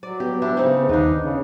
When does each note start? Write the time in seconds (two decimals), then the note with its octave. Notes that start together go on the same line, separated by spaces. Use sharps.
0.03 F#3 D5
0.20 B3 G4
0.42 D4 E4 G4
0.57 C#3 C4 D#4
0.89 D#2 B3 D4 D#4
1.24 C#3 C#4